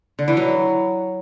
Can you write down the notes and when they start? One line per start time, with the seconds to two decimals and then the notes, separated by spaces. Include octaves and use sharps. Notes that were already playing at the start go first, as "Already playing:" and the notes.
0.19 D3
0.28 E3
0.37 F#3